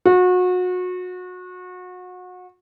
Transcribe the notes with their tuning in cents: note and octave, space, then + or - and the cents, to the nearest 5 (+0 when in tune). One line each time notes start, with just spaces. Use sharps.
F#4 -30